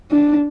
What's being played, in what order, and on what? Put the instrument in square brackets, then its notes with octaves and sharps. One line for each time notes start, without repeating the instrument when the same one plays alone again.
[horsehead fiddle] D4